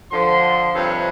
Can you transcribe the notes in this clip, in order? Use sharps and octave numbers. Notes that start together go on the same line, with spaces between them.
D3 F3 C6
G2 C3 F3 A4 B4 C#5